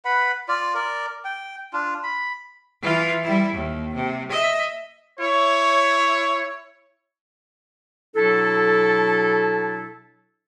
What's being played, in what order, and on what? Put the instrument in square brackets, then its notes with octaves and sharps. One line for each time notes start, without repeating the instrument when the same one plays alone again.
[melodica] B4 F#5 B5
F4 D5
A#4 D5
G5
D4 F4
B5
[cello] E3 F4
G3 E4
D#2
C3
D#5 E5
[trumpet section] E4 C#5
[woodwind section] B2 F#3 D4 E4 A4